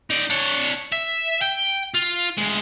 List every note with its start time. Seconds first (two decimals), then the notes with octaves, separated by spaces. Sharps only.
0.10 D#4 D5
0.30 D4 C#5
0.92 E5
1.42 G5
1.94 F4
2.38 D2 G#3